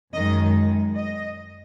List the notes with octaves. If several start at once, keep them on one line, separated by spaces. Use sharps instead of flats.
F#2 D#3 G#3 D#5
D#5